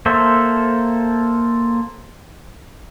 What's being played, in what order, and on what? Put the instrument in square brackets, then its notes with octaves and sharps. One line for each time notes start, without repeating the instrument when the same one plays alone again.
[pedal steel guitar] A#3 A4 C5 E5